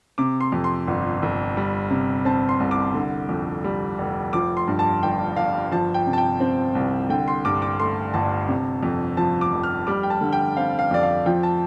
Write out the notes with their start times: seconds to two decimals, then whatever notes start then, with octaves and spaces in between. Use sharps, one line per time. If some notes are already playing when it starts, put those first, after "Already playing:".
0.18 C3 D6
0.41 C6
0.52 F2
0.64 C6
0.87 G1
1.22 G1
1.57 G3
1.90 C3
2.25 C4 A5
2.49 C6
2.60 C2
2.71 D6
2.94 D3
3.29 F2
3.64 G3
3.98 F1
4.33 F3 D6
4.57 C6
4.68 G2
4.79 A5
5.03 G1 G5
5.36 G1 F5
5.72 F3 A5
5.94 G5
6.07 C3
6.13 A5
6.18 G5
6.40 C4
6.75 C2
7.10 D3 G5
7.28 C6
7.45 G2 D6
7.62 D6
7.79 A3 C6
8.14 G1 A5
8.48 C3
8.83 F2
9.17 F3 A5
9.41 D6
9.52 F1
9.63 F6
9.87 G3 D6
10.03 G5
10.10 A5
10.21 D3
10.33 G5
10.57 C4 F5
10.79 F5
10.91 F2 D5
11.03 F5
11.26 F3 G5
11.43 A5